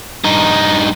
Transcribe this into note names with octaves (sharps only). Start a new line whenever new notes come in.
G2 D#4